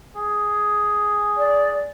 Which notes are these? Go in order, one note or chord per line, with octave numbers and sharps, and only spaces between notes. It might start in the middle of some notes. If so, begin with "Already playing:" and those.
G#4
D5